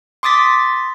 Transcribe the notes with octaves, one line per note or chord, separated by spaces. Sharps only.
C6 D6 D#6 A6 B6